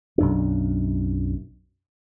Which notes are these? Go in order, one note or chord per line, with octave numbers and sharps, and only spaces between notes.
B1 F#2 D4